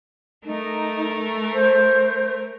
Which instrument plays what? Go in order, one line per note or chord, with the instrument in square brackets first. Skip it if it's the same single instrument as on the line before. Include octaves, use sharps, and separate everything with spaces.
[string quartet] A3 A#4 [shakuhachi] D#4
[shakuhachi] C5